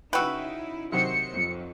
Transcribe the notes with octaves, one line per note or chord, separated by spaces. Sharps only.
C#3 D#4 E4 F#4 B4 G5 E6
C3 D#3 F#3 C5 C#7
F2